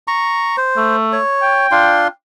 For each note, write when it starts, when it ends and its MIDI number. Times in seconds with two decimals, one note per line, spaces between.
0.08 0.56 82
0.08 0.56 85
0.57 0.96 72
0.77 1.18 57
1.12 1.67 73
1.42 2.10 79
1.71 2.08 62
1.71 2.08 65
1.71 2.08 84